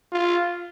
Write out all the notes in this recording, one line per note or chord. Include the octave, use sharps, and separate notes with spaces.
F4